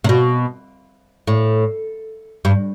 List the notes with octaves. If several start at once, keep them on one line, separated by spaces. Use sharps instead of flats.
C3
B2
A2
G2